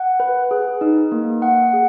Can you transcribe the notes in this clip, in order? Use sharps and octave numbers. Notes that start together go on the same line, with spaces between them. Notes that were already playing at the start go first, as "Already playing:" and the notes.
Already playing: F#5
B4
G#4
D#4
A#3
F#5
G#4